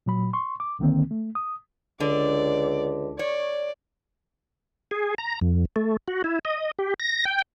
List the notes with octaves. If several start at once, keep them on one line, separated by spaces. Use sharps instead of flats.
A#2 F#3 B5
C6 C#6
D6
C2 D3 D#3 A#3 C4
A3
D#6
C#2 D3 D5
C#5 D5
G#4
A#5
F2
A3
F#4
E4
D#5
G4
A#6
G5